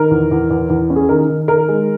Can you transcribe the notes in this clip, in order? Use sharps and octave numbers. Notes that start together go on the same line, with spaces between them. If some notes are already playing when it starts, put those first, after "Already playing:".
Already playing: D#3 A#4
E2
E2
E2
E2
C#4
G#4
D#3 A#4
D#3
D#3 A#4
G#3